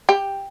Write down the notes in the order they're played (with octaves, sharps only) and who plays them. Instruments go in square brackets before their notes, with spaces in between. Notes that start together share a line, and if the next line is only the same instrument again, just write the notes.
[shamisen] G4